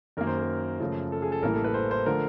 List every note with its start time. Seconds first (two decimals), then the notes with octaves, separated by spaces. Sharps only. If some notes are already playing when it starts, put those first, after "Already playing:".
0.17 F#2 D#3 F#3 A#3 A#4
0.27 C5
0.38 A#4
0.80 F#2 C#3 F3 A3
1.12 A4
1.22 G#4
1.32 A4
1.42 A1 A2 E3 G3 A#3 A#4
1.54 A4
1.64 B4
1.74 C5
1.91 C5
2.06 D3 F3 A3 A#4